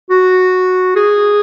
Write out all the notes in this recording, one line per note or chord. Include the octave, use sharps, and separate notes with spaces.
F#4
G#4